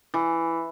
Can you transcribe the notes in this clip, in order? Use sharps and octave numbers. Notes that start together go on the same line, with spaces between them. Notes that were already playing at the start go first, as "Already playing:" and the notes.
E3